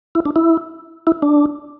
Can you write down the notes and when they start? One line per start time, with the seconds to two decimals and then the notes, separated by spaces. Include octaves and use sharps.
0.15 E4
0.25 D4
0.36 E4
1.07 E4
1.22 D4